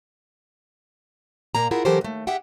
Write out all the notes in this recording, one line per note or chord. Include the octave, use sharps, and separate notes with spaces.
A#2 A#3 A#5
E4 F4 G#4 A#4 C5 F#5
E3 F#3 G4 A4 A#4 C5
D#2 A3
G4 G#4 E5 F#5 G5